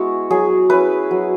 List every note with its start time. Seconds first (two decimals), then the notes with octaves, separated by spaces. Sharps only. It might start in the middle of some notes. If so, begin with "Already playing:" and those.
Already playing: G#3 B3 E4 F#4
0.30 F#3 G#4
0.70 C#4 E4 B4
1.11 F#3